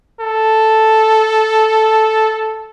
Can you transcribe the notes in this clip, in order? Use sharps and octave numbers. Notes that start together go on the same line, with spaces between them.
A4